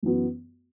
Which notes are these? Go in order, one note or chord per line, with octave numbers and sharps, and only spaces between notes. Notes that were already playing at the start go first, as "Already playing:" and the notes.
F#2 E3 B3 F#4